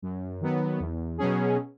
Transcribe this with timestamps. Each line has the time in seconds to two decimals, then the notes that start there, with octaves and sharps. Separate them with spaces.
0.02 F#2
0.41 D#3 F#3 B3
0.80 E2
1.18 B2 F#3 C#4 G#4